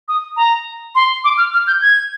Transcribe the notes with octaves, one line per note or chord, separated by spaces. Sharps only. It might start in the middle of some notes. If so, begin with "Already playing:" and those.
D#6
A#5
C6
D6
F6
F6
G6
G#6